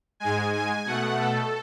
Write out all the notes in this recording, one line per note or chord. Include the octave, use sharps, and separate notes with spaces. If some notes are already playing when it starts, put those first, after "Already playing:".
G#2 G#3 G#5
G#5
B2 A3 F#5
A4